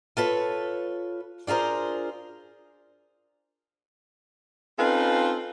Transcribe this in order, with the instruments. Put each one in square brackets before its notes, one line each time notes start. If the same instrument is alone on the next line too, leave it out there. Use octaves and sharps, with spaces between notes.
[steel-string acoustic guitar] F4 A4 B4 C#5
D4 F4 G#4 A#4 C5
[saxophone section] C4 C#4 D#4 F4 A4 B4